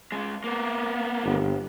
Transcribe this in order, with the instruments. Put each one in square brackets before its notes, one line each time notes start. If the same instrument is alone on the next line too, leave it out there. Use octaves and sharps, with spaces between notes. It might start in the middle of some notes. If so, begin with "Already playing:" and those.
[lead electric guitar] C#2 G#3
A#3 B3
[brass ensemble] G1